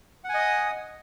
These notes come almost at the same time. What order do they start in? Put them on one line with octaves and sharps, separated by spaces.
F#5 G#5 D#5 D#6